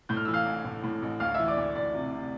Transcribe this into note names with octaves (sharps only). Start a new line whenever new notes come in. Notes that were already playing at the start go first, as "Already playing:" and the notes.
A2 G6
F6
E3 E6
F5 F6
A1
A2
A2
A1
D2 F5 F6
E3 E5 E6
D5 D6
D2
D2 D5
C3
C3